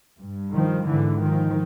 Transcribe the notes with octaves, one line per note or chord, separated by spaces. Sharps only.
G2
D#3 F3
G#2 D3 E3
D#3 F3